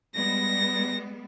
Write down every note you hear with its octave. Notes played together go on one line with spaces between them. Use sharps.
G3 G#3 B3 A#6